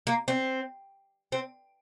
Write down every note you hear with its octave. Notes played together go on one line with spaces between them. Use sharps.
A#3
C4
C4